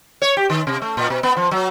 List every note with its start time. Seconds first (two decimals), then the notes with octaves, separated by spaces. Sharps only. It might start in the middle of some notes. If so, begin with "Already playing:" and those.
0.22 C#5
0.37 G4
0.50 D#3
0.67 C3
0.82 A3
0.97 A#2
1.10 B2
1.23 B3
1.37 F3
1.51 F#3